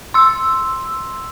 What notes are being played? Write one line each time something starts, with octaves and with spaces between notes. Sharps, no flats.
C6 E6